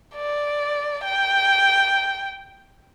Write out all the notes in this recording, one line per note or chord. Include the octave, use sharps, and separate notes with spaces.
D5
G5